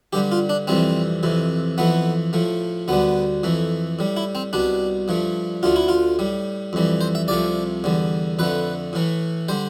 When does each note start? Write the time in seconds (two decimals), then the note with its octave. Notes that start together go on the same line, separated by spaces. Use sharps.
0.13 G2 D3 G3 G4
0.32 F4
0.49 D4
0.67 F2 C3 E3 G3 C4
1.23 F2 C3 E3
1.78 F2 E3 A3 B3
2.33 A2 F3 A3
2.88 D2 D3 G3 B3
3.43 F2 E3 A3
3.99 A2 G3
4.17 E4
4.35 C4
4.53 C2 B2 G3 D4
5.08 G2 F3 A3
5.63 D2 D3 A3 F4
5.76 E4
5.88 F4
6.19 A2 G3
6.73 F2 E3 G3
7.01 C5
7.15 E5
7.28 C2 C3 F3 A3 D5
7.84 E2 D3 G3
8.39 F2 D3 A3 B4
8.93 A2 E3 A3
9.48 D3 G3 C5